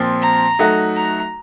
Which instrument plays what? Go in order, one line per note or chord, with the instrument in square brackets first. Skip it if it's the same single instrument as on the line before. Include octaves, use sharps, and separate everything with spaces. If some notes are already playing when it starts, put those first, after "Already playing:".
Already playing: [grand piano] A#2 F3 C4
[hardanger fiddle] A#5
[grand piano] F#3 A3 D#4 F#4
[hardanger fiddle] A#5